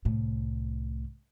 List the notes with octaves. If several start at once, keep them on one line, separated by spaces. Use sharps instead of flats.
C2 A2